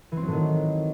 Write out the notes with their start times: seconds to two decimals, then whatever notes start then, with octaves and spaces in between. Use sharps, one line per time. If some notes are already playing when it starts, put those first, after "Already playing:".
0.12 E3
0.17 C4
0.22 F#3
0.28 A2
0.33 D#3